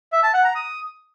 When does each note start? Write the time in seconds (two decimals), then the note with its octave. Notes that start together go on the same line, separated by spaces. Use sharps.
0.12 E5
0.23 A5
0.34 F#5
0.44 A#5
0.55 D#6